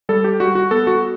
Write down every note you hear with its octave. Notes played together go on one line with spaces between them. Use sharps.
G3 A4
G4
G3 F#4
F#4
B3 A4
F#4